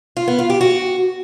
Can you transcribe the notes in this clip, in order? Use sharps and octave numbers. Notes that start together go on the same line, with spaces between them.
F4
B3
F4
G4
F#4